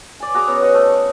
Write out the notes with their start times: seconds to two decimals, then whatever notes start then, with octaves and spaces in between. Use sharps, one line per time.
0.20 D5 G#5
0.34 F#4 G#4 A#5 D6
0.47 B3 C#4 C#5
0.62 F#4 D#5 F#5
0.74 A3
0.92 C#6